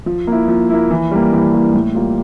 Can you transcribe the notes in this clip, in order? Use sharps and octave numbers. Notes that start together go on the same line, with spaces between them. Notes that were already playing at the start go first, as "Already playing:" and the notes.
F3
A#3 E4
F3
A#3 E4
E3
G3 A#3
E3
G3 A#3
A2
G3 A#3 F4